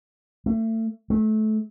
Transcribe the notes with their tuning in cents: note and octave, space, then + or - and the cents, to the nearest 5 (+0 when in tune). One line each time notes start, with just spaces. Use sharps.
A3 +30
A3 -25